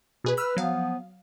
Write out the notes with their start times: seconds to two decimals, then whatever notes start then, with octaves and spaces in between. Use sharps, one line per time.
0.24 B2 G#4 B4
0.37 B4 B5 E6 F6
0.57 F3 F#3 B3 F5